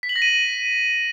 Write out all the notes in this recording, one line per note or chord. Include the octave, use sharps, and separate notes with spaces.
B6
F#7
A#6
D#7